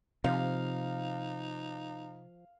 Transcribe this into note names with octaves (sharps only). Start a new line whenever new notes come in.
C3 F3 D#4 F5